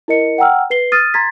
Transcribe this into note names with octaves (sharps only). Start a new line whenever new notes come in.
E4 A#4 D#5 C#7
F#5 G5 A#5 E6 F6
B4 C7 G7
D#6 F6 A6 D#7
A#5 C6 G#6 A6 B6